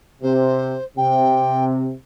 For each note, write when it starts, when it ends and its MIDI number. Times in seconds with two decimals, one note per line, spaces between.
0.22 0.75 48
0.22 0.84 72
0.97 1.92 48
0.97 1.65 79